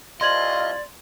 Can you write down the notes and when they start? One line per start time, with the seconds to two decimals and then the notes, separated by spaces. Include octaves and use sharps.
0.21 C2 F4 D5 D#5 C6 G#6 F#7